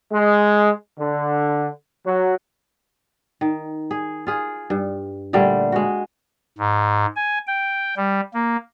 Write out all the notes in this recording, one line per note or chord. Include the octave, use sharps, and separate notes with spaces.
G#3
D3
F#3
D#3
G#4
F4 G#4
G2
A#2 D3 G3 A3
G#3 F#4
G#2
G#5
G5
G3
A#3